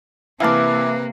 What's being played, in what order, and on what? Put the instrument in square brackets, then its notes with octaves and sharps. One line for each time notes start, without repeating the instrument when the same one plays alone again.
[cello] C3 A#3 [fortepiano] E3 F5 A5 [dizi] B4 [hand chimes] E5 D6